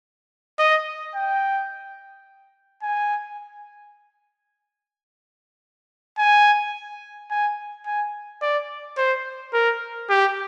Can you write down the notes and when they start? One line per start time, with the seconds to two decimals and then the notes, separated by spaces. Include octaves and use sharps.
0.59 D#5
1.15 G5
2.83 G#5
6.18 G#5
7.30 G#5
7.86 G#5
8.42 D5
8.97 C5
9.53 A#4
10.09 G4